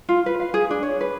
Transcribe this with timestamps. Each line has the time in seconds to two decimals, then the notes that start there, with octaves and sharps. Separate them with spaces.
0.09 F4
0.26 B4
0.40 F5
0.54 G#4
0.71 D4
0.83 C#5
1.01 B4